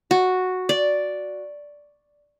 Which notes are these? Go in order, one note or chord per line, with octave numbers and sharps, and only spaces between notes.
F#4
D5